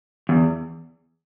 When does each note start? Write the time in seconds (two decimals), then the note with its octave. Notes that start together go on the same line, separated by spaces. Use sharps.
0.29 E2